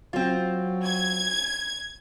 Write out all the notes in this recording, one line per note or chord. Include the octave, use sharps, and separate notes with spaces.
F#3 C4 F4
G#6